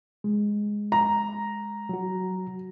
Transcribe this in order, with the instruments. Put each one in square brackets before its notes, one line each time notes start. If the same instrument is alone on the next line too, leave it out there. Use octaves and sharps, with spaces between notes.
[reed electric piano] G#3
[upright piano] A#5
[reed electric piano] F#3 F#4